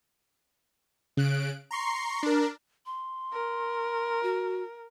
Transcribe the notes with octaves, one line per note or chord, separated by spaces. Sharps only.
C#3 F#6 D7
A#5 C6 C#6 C7
D4 A#4
C6
A#4
F#4